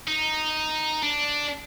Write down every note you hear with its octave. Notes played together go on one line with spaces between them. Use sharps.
D#4
D4